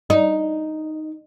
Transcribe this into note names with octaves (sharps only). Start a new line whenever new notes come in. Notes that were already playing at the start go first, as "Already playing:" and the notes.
D#4